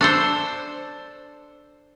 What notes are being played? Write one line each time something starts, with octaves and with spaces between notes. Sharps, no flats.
D4 A4 C5